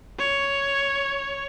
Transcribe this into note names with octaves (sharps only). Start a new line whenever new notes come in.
C#5